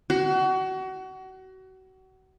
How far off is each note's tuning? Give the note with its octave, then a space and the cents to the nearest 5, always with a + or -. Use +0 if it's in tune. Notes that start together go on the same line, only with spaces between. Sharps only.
F#4 +30